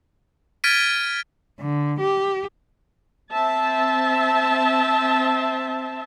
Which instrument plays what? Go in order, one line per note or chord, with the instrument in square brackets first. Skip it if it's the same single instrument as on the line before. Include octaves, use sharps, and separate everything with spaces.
[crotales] F6 G#6 A6 B6 D7 D#7
[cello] D3
G4
[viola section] C4 E5 A5